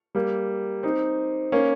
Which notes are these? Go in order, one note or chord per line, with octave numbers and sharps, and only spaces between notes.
G3 A#3
C4 D#4
A#3 C#4